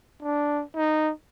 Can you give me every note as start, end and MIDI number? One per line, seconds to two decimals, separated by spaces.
0.23 0.63 62
0.76 1.11 63